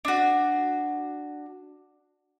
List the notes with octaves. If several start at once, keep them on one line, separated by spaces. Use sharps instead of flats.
D4 F#4